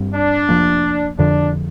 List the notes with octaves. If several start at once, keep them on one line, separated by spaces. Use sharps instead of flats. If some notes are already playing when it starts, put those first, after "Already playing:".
Already playing: G2 G3 C4
D4
F1 F2 F3 A#3
F2 D3 F3 D4